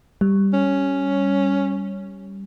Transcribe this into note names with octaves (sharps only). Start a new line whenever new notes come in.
G3
C#4